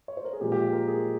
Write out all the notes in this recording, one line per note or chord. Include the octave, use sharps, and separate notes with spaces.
C#5
C5
A#4
G#4
A#2 F3 G#3 G4
G4
F4
A#4
G#4